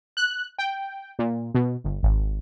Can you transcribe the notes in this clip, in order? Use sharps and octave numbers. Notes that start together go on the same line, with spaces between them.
F#6
G5
A#2
B2
G1
G#1